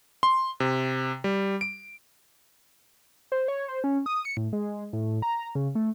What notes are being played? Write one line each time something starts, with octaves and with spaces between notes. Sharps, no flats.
C6
C3
G3
D7
C5
C#5
C5
C#4
D#6
C#7
A2
G#3
A2
A#5
C#3
A3